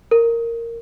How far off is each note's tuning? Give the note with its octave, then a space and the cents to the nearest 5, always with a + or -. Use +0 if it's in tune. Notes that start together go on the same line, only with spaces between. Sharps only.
A#4 -10